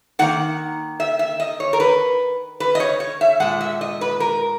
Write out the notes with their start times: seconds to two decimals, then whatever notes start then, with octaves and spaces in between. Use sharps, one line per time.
0.19 D#3 A#3 F#5
1.00 E5
1.19 E5
1.40 D#5
1.60 C#5
1.73 A#4
1.80 B4
2.60 B4
2.75 D#5
2.80 C#5
3.00 C#5
3.21 E5
3.40 A#2 G#3 F#5
3.61 E5
3.81 D#5
4.01 B4
4.20 A#4